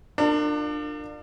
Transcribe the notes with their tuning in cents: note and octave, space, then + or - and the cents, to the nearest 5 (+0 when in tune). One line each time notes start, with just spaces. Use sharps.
D4 +30 F4 +15 A#4 -35